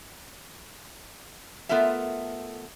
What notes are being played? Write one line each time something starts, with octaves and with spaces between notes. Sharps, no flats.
A3 B3 F4 A4 A#4 E5